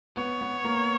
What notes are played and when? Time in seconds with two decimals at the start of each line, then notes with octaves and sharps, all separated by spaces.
0.17 B3 C#5
0.41 B3
0.64 A#3